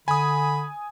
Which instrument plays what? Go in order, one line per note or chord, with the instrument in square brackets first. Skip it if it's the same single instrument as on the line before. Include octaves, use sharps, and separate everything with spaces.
[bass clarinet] D3 [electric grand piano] G#5 D#6 [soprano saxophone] B5